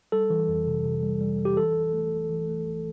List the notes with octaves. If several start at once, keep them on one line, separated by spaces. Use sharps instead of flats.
G3 A4
E3
F2
C3
C3
G3
G3
G3
G4
E3 A4
A1
A3
A1
E3
A3
A1